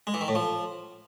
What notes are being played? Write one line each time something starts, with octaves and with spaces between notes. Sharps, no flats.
G#3
E3
D#3
A2
F3